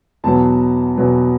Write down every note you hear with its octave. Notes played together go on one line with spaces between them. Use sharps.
E2 B2 F#3 B3 A5
E2 B2 F#3 B3